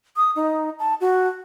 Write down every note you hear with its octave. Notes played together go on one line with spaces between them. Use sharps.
D#6
D#4
A5
F#4